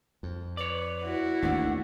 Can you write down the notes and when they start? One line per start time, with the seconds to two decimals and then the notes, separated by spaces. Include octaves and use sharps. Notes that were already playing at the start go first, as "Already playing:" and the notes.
0.23 F2
0.57 B4 C#5 D5
1.02 E4 F#4
1.42 G#1 D#2 A3 D4 F#5